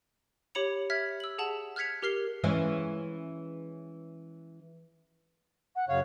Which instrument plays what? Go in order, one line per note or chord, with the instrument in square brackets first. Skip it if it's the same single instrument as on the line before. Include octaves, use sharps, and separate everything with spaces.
[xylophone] G4 C#5 B5 C#7 F7
E5 F6 G#6 B6
E6 F#7
G#4 F#5 A5 F#7
F6 F#6 G#6 B6 C#7 F7
G4 A#4 F6 C7 G7
[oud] E3 G#3 C#4
[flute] F#5
[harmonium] F#2 C#3 C#5 [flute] F5